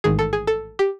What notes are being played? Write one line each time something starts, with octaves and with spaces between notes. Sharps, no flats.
A1 G#2 D#3 G#4
A4
G#4
A4
G4